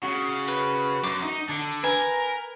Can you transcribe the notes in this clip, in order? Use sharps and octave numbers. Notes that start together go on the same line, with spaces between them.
C#3 F#4
B4
F#2 D6
D#4
D3 A5
A#4 B4 G#5